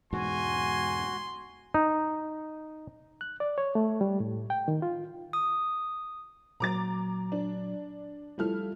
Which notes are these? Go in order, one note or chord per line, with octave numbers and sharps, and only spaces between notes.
E2 G#2 B2 F#4 G#5 C6
D#4
F#6
D5
C#5
A3
G3
A2
G5
D#3
F4
D#6
A#2 F#3 A#5 D6 A6
D4
F3 G3 E4 A4 F6